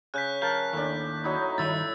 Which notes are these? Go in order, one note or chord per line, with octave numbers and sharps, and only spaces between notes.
C#3 F#6 G6 B6
A#4 F5 A5 G6
D#2 A2 D4
F#3 D#4 E4
G2 D#3 E4 E5 E6 A6